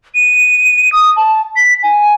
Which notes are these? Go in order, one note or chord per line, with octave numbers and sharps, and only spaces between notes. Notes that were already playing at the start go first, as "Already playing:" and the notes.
D#7
D#6
A5
B6
G#5